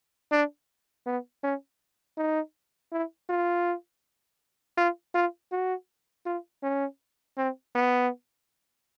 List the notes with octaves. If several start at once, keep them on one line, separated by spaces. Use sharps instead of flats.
D4
B3
C#4
D#4
E4
F4
F4
F4
F#4
F4
C#4
C4
B3